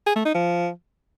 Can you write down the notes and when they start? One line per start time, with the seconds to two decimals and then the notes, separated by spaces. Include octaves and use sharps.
0.06 G#4
0.16 A3
0.25 D#4
0.35 F3